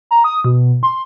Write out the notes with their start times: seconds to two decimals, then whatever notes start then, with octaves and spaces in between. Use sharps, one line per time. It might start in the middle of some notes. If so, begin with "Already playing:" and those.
0.11 A#5
0.24 D#6
0.45 B2
0.83 C6